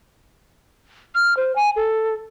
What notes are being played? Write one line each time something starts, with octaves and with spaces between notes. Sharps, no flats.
F6
C5
G#5
A4